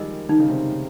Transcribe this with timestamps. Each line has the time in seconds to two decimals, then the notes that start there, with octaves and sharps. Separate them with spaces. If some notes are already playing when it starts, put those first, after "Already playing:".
Already playing: D#3 F3 G3 G#3 A#4 D#5
0.29 D#3 D#4
0.39 C#3
0.50 C3 D#3